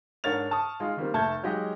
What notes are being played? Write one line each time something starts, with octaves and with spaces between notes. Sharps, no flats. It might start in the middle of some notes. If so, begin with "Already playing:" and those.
G#2 D4 A#4 C#5 A6 F7
A5 C#6 D#6
G#3 D#4 F4
D#3 G3 A#3 C4
F1 A3 A5 G6 G#6
F#3 G#3 D#4 G4 D#5